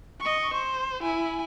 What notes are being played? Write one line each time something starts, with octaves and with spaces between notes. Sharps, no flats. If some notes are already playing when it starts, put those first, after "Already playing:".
D#5 C#6
C5
E4 G#5